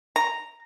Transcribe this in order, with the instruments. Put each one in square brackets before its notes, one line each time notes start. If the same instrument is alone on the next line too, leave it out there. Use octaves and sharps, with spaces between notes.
[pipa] A#5